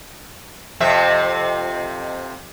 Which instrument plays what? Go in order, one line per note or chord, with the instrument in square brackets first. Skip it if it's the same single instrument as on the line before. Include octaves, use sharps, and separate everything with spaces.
[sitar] F2 C3 E5